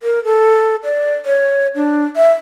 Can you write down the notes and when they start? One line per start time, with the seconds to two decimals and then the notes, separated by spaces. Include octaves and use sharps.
0.03 A#4
0.24 A4
0.84 D5
1.26 C#5
1.76 D4
2.16 E5